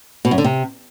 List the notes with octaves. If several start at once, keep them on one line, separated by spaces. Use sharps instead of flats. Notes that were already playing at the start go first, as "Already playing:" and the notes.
B2
F#2
D3
C3